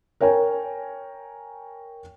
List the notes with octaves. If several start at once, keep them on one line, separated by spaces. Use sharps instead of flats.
A#4 C#5 G5 G#5